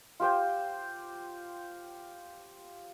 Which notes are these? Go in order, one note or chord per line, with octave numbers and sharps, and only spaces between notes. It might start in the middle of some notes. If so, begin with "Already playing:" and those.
F4 G4 C5 G5